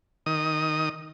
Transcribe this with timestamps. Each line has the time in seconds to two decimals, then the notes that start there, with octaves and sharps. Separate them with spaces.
0.26 D#3 D#6